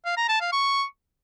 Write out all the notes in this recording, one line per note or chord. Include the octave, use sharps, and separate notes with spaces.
F5
A#5
A5
F5
C#6